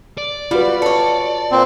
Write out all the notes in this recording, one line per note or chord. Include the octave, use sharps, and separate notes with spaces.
D5
G3 F4 F#4 B4
A4 C#5
A#2 C4